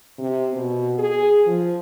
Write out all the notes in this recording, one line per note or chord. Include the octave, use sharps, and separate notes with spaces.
C3
B2
G#4
F3